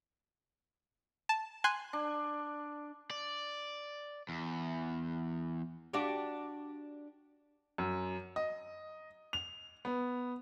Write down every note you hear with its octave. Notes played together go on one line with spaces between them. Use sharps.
A5
G#5 C6 F#6
D4
D5
E2
D4 F#4 G4
F#2
D#5
F7
B3